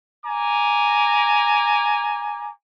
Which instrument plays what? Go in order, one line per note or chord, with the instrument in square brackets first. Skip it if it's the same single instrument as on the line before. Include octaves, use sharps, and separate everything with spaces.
[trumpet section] G#5 A#5 D6